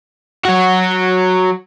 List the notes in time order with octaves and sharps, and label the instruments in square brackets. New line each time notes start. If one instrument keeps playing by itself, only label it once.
[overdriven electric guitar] F#3 F#4